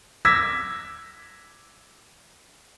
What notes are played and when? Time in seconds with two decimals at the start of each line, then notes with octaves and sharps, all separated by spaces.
0.25 D6 E6 G#6 A#6 B6